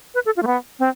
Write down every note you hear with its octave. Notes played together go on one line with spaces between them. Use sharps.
B4
A4
F4
A3
B3
C4